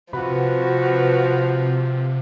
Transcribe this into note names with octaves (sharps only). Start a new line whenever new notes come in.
C3 F3 F#4 B4